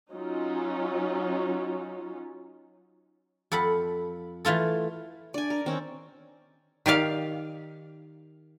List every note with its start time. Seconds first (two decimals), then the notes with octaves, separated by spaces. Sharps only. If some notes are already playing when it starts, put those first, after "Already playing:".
0.11 F#3 C#4 D#4 F4
3.52 F2 A4 F#5 B5
4.45 E3 A3 F4 A4
5.34 D4 D5 G#5
5.50 A#4
5.66 D#3 C4 C#4
6.86 D#3 G4 D5 F5